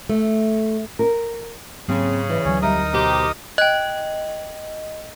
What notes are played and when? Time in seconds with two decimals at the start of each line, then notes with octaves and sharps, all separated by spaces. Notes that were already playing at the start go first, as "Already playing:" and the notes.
0.09 A3
0.99 A#4
1.88 G#2 C#3 F#3 A#3 C4 G#4 G#5
2.30 E3 B4 D5
2.45 D2 F#3 C#4
2.62 F2 G3 D#4 A#4 E5 D#6
2.93 B2 F#4 G4 C5
3.58 D#5 G5 F#6